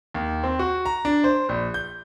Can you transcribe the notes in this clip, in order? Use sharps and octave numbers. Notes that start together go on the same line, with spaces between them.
D#2
C4
F#4
A#5
D4
C5
A#1
G6